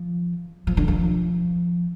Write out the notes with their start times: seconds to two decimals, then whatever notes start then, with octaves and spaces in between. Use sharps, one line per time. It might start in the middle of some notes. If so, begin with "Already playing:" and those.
Already playing: F3
0.67 F3
0.77 D3
0.88 F3